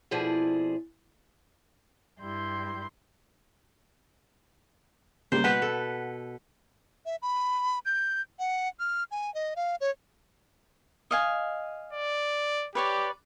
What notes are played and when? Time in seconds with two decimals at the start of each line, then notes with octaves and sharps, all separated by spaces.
0.11 F2 B2 F3 E4 G#4 D5
2.20 G2 G3 E4 C6 G6
5.32 C#3 G3 A#3 C5
5.44 B2 B4 F#5 E7
5.62 A4
7.06 E5
7.22 B5
7.86 G6
8.39 F#5
8.79 F6
9.11 G#5
9.35 D#5
9.56 F5
9.81 C#5
11.11 D#5 F5 G#5
11.93 D5
12.75 G4 B4 C#5 D5